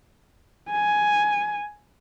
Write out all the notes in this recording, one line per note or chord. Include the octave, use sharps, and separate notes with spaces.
G#5